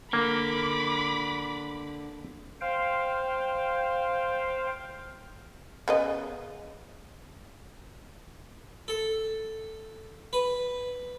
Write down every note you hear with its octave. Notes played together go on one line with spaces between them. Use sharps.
D3 A#3 B5 D6
C5 F5 G5
C#3 B3 D#5
A4
B4